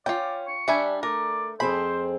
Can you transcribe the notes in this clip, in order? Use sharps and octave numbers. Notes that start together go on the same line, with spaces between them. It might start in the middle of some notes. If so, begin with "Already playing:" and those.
C#4 F4 D5 G5
C#6
G3 D4 E5 G#5
A3 A#4 D5
F2 C4 G#4 C5 B5